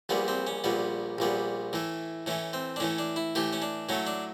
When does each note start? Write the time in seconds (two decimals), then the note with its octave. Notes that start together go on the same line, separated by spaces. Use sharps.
0.09 A#1 A#2 G3 B3
0.28 C4
0.47 C#4
0.64 A#1 A#2 G3 B3
1.18 A#1 A#2 G3 B3
1.73 A2 E3 A3
2.26 A2 E3 A3 C#4
2.53 C4
2.76 D4
2.80 A2 E3 A3 C#4
2.98 D4
3.16 E4
3.35 A2 E3 A3 G4
3.53 C#4
3.62 D4
3.89 A2 F#3 A3 C#4
4.07 D4